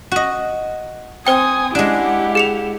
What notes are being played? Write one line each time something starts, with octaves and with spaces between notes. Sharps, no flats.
F#4 D#5
C4 C5 G5 G#5 D#6
G#3 D4 E4 G4 F#5
G#4 C#7 F7